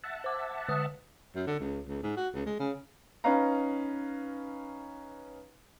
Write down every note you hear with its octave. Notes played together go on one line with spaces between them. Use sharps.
E5 F#5 A5
C5 D6
D3 D#6
F#2
D3
C#2
C#2
G#2
F#4
C#2
G#3
C#3
C#4 D#4 B4 F5 A#5